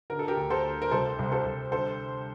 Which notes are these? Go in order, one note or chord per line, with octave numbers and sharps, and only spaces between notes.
D3 A#4
A4
G4 A#4
D2
A4 C5
D2
A#4
C2 A4 C5
C2
A4 C5
C2
D3 A4 C5